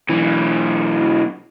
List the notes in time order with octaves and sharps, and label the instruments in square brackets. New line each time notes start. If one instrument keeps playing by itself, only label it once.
[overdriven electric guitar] B1 E3